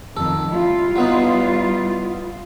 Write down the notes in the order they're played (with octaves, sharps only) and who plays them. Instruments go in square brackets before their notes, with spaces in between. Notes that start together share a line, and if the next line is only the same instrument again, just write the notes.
[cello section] F2 D#3 [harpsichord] A4
[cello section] G3 E4 F4
[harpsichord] F#3 B3 D#4